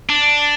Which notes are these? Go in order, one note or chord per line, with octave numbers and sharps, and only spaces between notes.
D4